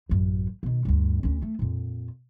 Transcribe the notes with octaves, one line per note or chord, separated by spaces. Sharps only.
A1 F#2
B2 D#3
D2 G2
D2 C#4
A3
F2 A#2